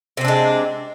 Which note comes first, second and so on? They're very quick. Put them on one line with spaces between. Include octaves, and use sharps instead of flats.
C3 C4 D4 G#3